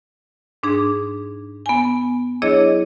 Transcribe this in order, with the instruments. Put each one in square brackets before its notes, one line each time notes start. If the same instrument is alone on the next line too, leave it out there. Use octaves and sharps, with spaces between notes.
[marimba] G#2 D4 D#4 G#4
B3 G#5
F#3 D4 E4 G#4 C#5 D#5